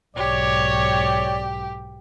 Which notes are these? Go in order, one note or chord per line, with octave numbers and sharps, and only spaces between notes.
B1 G#2 G4 C#5 D5